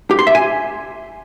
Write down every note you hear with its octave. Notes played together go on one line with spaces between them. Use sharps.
G4
C6
E5
G#5